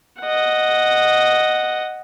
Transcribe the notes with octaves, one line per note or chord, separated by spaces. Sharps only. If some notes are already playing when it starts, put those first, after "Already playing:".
D#5 F#5